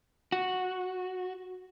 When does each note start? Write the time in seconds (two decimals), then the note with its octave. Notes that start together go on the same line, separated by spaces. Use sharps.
0.32 F#4